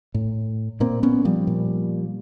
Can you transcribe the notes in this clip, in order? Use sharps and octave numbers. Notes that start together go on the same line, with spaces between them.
A2
A#2 A#3 C4
B3 C#4
F3 G3
A#2